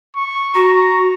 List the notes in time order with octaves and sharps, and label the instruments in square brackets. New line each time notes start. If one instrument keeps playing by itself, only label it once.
[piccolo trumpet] C#6
[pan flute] F#4 [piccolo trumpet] A#5